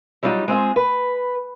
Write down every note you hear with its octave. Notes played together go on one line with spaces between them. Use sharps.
F#3 G3 D4 D#4 F4
G#3 C4 F4 G#4
B4